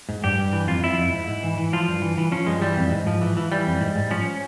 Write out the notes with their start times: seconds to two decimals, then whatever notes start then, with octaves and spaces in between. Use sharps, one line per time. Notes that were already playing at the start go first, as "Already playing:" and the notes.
0.09 G#2
0.24 G2 G4
0.38 G2
0.53 E3
0.68 F2 F4
0.83 F2 E4
0.98 F2
1.13 G#2
1.28 G#2
1.43 E3
1.57 E3
1.73 F3 F4
1.88 G2
2.02 E3
2.18 E3
2.32 F3 C#4
2.47 G2 G#3
2.62 E3 G3
2.77 F2
2.91 G#2
3.07 F3
3.21 E3
3.37 E3
3.52 E3 G3
3.66 F2
3.81 G#2
3.96 G#2
4.11 F3 C#4